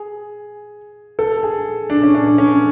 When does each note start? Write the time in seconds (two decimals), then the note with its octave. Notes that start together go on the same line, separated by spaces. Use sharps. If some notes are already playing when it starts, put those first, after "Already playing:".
Already playing: G#4
1.19 A4
1.43 G#4
1.90 D4
2.03 C#4
2.15 D4
2.38 C#4